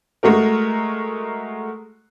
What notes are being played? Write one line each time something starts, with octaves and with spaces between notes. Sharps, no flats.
G#3 A3 F#4 A#4